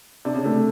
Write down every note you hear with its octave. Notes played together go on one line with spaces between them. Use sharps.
C3 D4
C#3
C3 A3